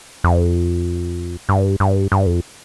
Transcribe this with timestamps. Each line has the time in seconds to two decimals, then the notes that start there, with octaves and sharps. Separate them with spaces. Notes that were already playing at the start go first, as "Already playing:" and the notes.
0.24 F2
1.49 G2
1.80 G2
2.12 G2
2.27 F2